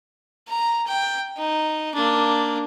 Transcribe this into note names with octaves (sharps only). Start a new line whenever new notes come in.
A#5
G5
D#4
A#3 D4